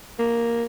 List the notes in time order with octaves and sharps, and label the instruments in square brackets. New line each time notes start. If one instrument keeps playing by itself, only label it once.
[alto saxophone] A#3